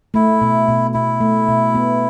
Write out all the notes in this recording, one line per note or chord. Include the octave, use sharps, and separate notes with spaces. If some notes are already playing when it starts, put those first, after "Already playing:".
A3 E4
B2
B2
B2 E4
A3
B2
B3